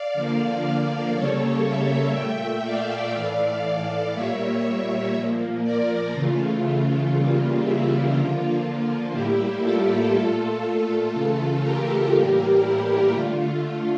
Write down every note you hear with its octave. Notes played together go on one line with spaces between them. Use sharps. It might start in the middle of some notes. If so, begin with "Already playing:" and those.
Already playing: D5 F5
D3 F3 A#3
C#3 G3 A#3 A4 C#5
C#5 E5
A#2 A3 E5 G5
D5 F5
A2 E3 A3
D5 F5
A#2 G3 A#3 C#5 E5
A#2 F3 A#3
A#4 D5
C#3 E3 A3 F4
F4
C#3 E3 G3 A#3 F4
E4
D3 F3 A#3 F4
F4
A2 G3 A#3 E4 G4
F4 A4
A#2 A3
C#3 E3 A3 F4 A4
G4 A#4
A2 E3 G3 A#3 G4 A#4
E4 G4
D3 A3 F4